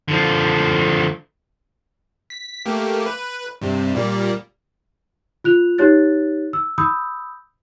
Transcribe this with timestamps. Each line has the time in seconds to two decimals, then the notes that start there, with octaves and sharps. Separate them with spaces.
0.08 D3 F3
2.30 B6
2.66 A3 A#3 G4
3.06 B4
3.61 G2 C3
3.95 A#2 G3 A#3
5.44 F4 F#6 F7
5.78 D#4 G4 C#5 F#6 A6
6.53 E6
6.78 B5 D#6 E6 G6